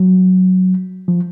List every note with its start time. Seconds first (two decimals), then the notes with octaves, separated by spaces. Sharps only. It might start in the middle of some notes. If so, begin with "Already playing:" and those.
Already playing: F#3
1.08 F3